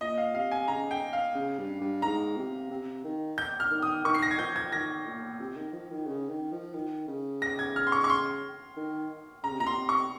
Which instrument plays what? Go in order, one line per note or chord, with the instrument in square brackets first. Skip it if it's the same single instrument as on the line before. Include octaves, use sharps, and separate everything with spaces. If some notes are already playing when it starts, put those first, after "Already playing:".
[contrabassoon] A#2 [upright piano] D#5
[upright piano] F5
[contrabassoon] C3 [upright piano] F5
[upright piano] G#5
[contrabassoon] C#3 [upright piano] A#5
[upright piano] G5
F5
[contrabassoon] C#3
G2
G2
[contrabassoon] G#2 [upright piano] A#5
[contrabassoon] C3
C3
D#3
[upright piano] G6
F6
[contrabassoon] D#3
[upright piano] D#6
[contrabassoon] D#3 [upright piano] C#6
[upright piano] C7
A#6
G#6
[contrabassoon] F3 [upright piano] G6
[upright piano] G#6
[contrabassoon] D#3 [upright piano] A#6
[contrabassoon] A#2
C3
D#3
F3
D#3
C#3
D#3
F3
D#3
C#3
[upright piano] A#6
G#6
F6
C6
C#6
C#6
C6
[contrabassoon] D#3
[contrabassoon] C#3 [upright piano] A#5
[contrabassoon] C3
[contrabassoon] A#2 [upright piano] A#5
[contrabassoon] C3 [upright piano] C6
[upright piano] C#6